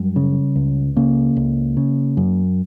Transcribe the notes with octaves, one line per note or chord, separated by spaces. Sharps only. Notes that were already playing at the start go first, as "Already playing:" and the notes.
Already playing: F#2 G3
C#3
C#2
C#3 A#3
C#2
C#3
F#2